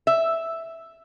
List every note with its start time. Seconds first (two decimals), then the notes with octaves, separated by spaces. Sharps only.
0.07 E5